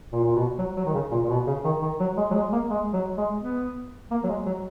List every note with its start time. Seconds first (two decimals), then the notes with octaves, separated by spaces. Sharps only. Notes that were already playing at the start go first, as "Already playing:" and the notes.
0.12 A#2
0.24 A#2
0.36 B2
0.59 F#3
0.77 F#3
0.85 D#3
0.94 C#3
1.11 A#2
1.24 A#2
1.29 B2
1.47 C#3
1.64 D#3
1.82 D#3
2.00 F#3
2.17 G#3
2.30 F#3
2.35 G#3
2.52 A#3
2.70 G#3
2.93 F#3
3.17 G#3
3.41 B3
4.11 A#3
4.24 F#3
4.29 G#3
4.46 F#3